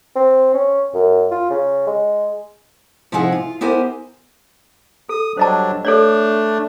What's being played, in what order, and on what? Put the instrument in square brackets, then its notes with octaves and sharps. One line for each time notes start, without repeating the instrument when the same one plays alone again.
[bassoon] C4
C#4
F#2
F4
C#3
G#3
[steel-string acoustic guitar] C3 F3 D#4 E4 G#4 F#5
F4
B3 E4 G4 A#4 C5 G#5
[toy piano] A4 [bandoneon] D#6
[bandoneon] F#3 G3 D4 [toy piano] C5 D#5 A5
[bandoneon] A3 D4 [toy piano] A4 C#5 D5